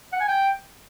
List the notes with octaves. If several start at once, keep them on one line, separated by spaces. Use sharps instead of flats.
F#5
G#5
G5